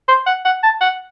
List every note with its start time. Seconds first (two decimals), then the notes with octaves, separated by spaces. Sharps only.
0.08 C5
0.27 F#5
0.45 F#5
0.63 A5
0.81 F#5